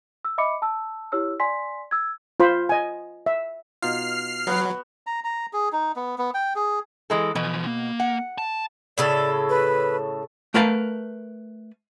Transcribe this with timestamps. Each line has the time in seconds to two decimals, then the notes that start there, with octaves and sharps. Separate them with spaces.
0.25 E6
0.38 D#5 E5 B5 D6 C#7
0.62 A5 E6
1.12 E4 G4 C#5 E6 F6
1.40 D5 G#5 C6 B6
1.91 E6 G#6
2.40 F4 C5 B5
2.69 D#5 G#5
3.26 E5
3.82 B2 D#4 F4 F6 C7
4.47 F#3 B3 F#4
5.07 A#5
5.24 A#5
5.53 G#4
5.73 D#4
5.96 B3
6.18 B3
6.34 G5
6.56 G#4
7.10 E3 G#3 A4
7.35 B2 E3 F3
7.67 A#3
8.00 F#5
8.38 A5
8.98 A2 C#3 A4 D5
9.49 B4
10.54 A3 A#4 B4 F5 A5